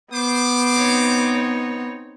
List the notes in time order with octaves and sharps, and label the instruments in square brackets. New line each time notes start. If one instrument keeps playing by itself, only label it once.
[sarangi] B3 [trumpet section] C5 D6
[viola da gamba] C4 D#4 C#5